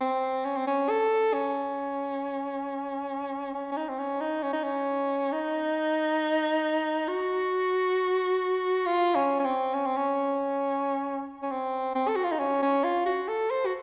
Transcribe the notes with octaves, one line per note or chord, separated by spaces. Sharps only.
C4
C#4
C4
C#4
A4
C#4
C#4
C#4
D#4
C4
C#4
D#4
C#4
D#4
C#4
D#4
F#4
F4
C#4
C#4
C4
C#4
C4
C#4
C#4
C4
C4
A4
F#4
F4
D#4
C#4
C#4
F4
F#4
A4
C5
F#4